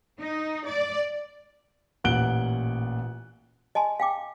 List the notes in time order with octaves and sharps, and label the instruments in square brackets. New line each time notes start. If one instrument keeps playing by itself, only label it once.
[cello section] D#4
D5
[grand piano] A1 A#2 F#5 F#6 D7 G7
[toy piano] D#5 G#5 A5 C6
F5 G5 D6